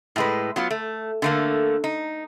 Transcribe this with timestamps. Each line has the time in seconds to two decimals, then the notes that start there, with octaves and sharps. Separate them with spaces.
0.16 A2 G#3 B4
0.56 F#3 B3 F4
0.71 A3
1.22 D3 A3 A#3
1.84 D#4